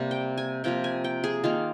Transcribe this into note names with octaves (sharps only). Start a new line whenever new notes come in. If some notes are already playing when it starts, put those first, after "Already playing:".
Already playing: C3 G3 A#3
G5
G#5
C3 F3 A#3 G5
G#5
G5
G#4
D#3 A#3 F4